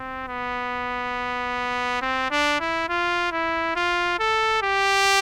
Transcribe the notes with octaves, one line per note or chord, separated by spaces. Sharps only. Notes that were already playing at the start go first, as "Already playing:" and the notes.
Already playing: C4
B3
C4
D4
E4
F4
E4
F4
A4
G4